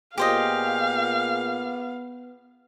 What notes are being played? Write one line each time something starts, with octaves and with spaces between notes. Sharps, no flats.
A#2 B3 G4 G#4 C5 D#5 F5